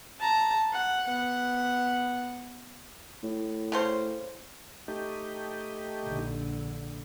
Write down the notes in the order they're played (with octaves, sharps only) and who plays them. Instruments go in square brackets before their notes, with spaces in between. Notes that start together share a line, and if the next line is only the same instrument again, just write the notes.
[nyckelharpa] A5 A#5
F#5
B3 F#5
[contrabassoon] A2
[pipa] C#3 C#4 C5
[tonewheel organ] A3 D#4 G4
[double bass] A#1 D3